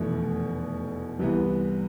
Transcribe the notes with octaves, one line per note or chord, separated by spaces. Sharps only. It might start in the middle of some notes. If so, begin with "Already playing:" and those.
Already playing: F1 E2 B2 A3
C2 C3 E3 B3